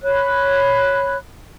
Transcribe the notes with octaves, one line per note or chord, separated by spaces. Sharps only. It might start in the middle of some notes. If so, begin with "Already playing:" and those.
C#5 B5 F#6